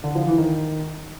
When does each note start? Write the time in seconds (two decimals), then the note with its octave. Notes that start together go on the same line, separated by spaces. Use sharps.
0.04 D3
0.15 F3
0.27 E3
0.38 D#3